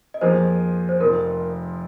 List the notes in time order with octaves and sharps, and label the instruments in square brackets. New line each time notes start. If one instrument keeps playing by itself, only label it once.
[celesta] D#5
[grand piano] F2 F3 A#3 G#4 [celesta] C5
[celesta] C5
[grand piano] F1 F2 F3 [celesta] A#4